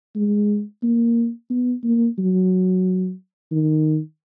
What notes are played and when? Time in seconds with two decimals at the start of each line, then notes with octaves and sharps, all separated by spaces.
0.16 G#3
0.83 A#3
1.50 B3
1.84 A#3
2.18 F#3
3.52 D#3